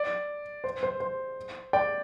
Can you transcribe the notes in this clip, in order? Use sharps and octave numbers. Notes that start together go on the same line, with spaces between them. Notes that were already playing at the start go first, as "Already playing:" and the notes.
Already playing: D5
C5
C5
C5
D5 G5